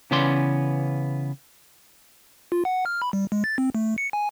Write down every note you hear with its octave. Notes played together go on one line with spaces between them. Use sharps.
C#3 E3 B3 C#4 D5 C6
F4
F#5
F6
B5
G3
G#3
A6
C4
A3
C#7
G#5